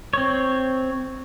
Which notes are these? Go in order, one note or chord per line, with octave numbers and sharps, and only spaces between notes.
C4 C#5